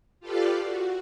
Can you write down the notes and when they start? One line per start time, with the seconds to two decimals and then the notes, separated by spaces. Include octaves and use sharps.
0.20 F4 G4 A4 B4 D5 F5
0.60 F#4